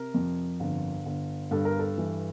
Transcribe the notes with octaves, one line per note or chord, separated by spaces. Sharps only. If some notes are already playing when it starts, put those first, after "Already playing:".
Already playing: C3 A#4
F2
G1
G1
G2 A4
A#4
A4
E3